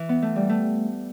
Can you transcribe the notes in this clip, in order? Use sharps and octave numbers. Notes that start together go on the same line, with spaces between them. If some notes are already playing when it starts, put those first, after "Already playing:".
Already playing: E3
B3
A3
G3
A3